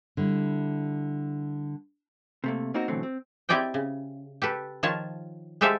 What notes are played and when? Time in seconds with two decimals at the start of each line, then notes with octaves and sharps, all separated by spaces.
0.17 D3 G3 E4
2.44 C3 A3 A#3
2.74 A#3 C4 D#4 F4 F#4 A#4
2.88 B2 D3 E3 F#3 A3 C4
3.03 C4
3.49 C4 E4 G4 D5 D#5 G5
3.74 C#3
4.42 G4 A4 B4
4.83 D#3 F3 F4 C#5 A5
5.61 G#3 G4 A4 C5 E5 F5